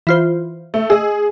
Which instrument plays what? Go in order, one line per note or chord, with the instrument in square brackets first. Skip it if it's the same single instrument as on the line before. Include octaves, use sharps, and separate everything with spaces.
[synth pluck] E3 F4 C5
[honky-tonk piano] A3
[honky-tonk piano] G#4 [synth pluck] D#5 E6